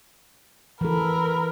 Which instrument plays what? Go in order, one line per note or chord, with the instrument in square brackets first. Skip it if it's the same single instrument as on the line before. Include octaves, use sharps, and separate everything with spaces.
[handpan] E3 A4 [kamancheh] A#4 B5